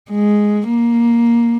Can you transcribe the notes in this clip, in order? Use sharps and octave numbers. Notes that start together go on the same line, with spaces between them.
G#3
A#3